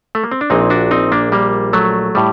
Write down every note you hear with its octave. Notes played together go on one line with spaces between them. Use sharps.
A3
A#3
C4
D4
A#1 A#2 C4 D#4
D4 F#4
C4 D#4
A#3 D4
G3 A#3
F#3 A3
A2 G3